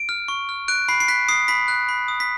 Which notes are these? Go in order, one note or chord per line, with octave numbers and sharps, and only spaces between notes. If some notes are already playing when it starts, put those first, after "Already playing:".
Already playing: D7
F6
C#6
F6
F#6 D7
B5 C7
C7
F#6 B6
D#6 C7
B5 B6
F#6
B5
D#6
B6